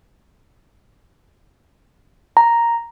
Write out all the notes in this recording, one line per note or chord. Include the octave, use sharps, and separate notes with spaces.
A#5